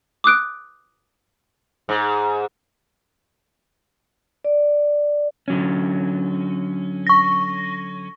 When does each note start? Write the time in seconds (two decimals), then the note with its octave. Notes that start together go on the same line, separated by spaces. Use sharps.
0.24 D6 D#6 F#6 D7
1.89 G#2
4.45 D5
5.48 D3 F#3 C#4
7.07 C#6 A#6